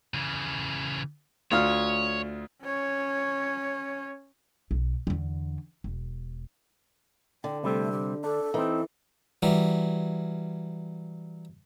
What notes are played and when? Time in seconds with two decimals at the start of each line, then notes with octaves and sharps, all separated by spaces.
0.14 C#3 E3
1.51 D2 F4 C#5 F6
2.62 C#4 C#5
4.71 B1
5.07 E2 D3
5.84 E1
7.44 D3 G5
7.63 C3 G3 A3 C4
7.92 G4
8.24 D4 A4
8.54 E3 C4 D#4
9.43 E3 F#3 G3